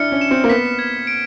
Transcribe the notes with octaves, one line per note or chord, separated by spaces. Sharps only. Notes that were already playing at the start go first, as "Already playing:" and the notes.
Already playing: D4 E4 F6 C#7
C#4
E7
C4
A#3
B3 B6
G#6
D7